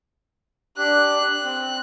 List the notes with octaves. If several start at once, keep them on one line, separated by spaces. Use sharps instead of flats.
D4 G4 F#6
C4